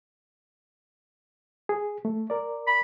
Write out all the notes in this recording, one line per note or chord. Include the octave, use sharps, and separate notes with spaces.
G#4
A3
A#4 D5
B5